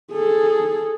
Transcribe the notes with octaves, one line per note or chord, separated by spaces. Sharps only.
G#4 A4